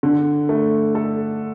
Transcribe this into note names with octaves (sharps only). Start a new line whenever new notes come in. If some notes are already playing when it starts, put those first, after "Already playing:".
D3
A3
A4